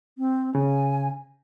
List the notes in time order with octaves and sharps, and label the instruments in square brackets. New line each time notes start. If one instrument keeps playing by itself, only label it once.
[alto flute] C4
[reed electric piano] C#3 [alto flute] G#5